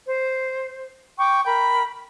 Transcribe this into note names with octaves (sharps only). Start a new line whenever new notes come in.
C5
G5 C#6 D6
A#4 G5 B5